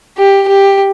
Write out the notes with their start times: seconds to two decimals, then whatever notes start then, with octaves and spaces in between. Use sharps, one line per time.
0.18 G4
0.48 G4